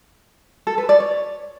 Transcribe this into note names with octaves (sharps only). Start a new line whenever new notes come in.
A4
B4
D5
C#5